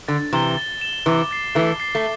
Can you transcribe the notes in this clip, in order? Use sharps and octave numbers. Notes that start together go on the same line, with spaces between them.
D3 A6
C3 E3 E7 G7
A6
E7 G7
C3 E3 D6
A6 C7
E3 A3 D6
A6 C7
A3